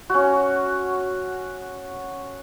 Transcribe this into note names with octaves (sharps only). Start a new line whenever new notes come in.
C#4 F#4